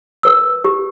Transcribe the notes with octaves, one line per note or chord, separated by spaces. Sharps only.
A#4 B4 E6
G4